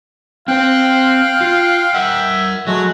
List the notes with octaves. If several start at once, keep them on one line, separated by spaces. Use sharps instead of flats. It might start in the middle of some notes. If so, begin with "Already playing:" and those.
C4 C5 F5 G5 F#6
F4
A#4 E5 F#5
F#3 G#3 A3 F#4